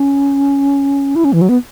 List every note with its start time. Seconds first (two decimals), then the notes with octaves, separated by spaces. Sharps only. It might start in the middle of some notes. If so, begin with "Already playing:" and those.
Already playing: C#4
1.16 E4
1.25 C#4
1.33 E3
1.41 F#3
1.49 B3